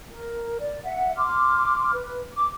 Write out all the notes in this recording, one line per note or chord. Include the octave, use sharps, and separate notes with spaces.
A#4
D5
E5 F#5
C6 D6 F6
B4
D6